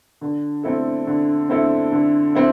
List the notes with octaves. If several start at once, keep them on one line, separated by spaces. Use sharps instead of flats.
D3
A3 C4 E4 A4
D3
A3 C4 E4 A4
D3
C4 E4 A4